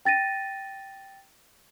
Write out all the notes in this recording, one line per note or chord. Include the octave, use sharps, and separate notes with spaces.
G5 A6 A#6 D#7